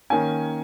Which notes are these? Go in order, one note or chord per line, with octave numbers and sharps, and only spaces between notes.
D#3 A#3 C#4 G#5